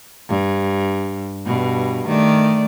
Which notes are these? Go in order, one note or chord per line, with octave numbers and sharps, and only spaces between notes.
G2
G2 B2
D#3 A3 D5